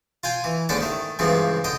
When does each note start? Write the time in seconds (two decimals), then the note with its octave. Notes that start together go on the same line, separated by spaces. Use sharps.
0.23 F4 G5 G#5
0.44 E3
0.69 D#2 G#2 D3 C#4 D4 D5
0.81 D#3 A3
1.19 C#2 G2 C#3 E3 F3 B3
1.64 D3 D#5 G5